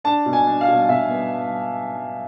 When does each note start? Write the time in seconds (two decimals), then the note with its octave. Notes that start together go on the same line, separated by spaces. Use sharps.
0.04 D4 A5
0.26 B2
0.33 G#5
0.47 D4
0.61 F5
0.68 B2
0.89 B2 E5
1.10 B3